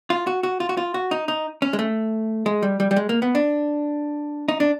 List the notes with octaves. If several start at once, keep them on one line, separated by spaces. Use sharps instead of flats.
F4
F#4
F#4
F4
F#4
F4
F#4
D#4
D#4
C#4
G#3
A3
G#3
G3
G3
G3
G#3
A#3
B3
D4
D#4
D4